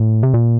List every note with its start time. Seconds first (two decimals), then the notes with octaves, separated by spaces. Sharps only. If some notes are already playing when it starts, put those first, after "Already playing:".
Already playing: A2
0.23 C3
0.34 A#2